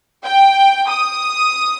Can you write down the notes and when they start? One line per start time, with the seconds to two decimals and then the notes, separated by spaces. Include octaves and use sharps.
0.25 G5
0.89 D#6